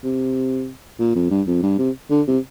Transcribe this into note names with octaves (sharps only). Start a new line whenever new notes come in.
C3
A#2
F2
G2
F2
G2
C3
D3
C3